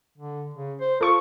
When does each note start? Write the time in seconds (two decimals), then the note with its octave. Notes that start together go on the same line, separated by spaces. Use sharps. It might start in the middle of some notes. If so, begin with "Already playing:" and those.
0.18 D3
0.54 C#3
0.80 C5
1.01 F4 A4 C#6